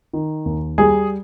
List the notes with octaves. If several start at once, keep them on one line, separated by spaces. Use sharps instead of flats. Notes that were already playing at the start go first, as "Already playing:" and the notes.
D#3
D#2
G3 G#4